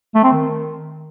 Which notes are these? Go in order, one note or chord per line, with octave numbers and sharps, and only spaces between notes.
A3
C4
D#3